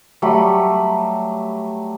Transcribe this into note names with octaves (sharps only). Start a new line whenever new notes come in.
F#3 G3 A3 B5